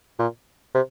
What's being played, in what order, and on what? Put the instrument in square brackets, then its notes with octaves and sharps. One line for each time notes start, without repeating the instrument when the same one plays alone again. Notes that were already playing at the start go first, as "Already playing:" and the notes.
[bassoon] A#2
C3